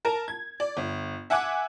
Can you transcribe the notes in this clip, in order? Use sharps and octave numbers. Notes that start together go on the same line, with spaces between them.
A#4 A5 A#5
G#6
D5
G1
E5 F#5 G#5 D6 F#6